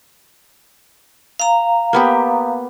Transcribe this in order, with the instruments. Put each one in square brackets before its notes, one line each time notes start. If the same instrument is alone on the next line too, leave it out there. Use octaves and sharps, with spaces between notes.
[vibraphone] F5 A#5
[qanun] A#3 B3 G4